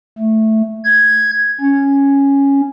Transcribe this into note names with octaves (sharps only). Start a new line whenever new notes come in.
A3
G#6
C#4